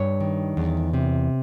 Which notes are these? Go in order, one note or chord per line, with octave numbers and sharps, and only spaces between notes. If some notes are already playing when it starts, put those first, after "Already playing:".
Already playing: G2 C#5
D#3
E2
C3